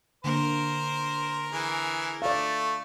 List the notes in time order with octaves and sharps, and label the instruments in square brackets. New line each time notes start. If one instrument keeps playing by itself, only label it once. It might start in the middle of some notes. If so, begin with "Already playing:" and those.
[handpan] D3 A#3 [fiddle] A#4 [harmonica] C5
[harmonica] E3 G#4
[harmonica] A3 [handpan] D5 F5